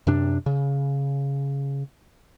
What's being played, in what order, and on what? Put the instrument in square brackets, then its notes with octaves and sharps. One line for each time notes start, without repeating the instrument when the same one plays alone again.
[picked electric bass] F#2 C3 D4
C#3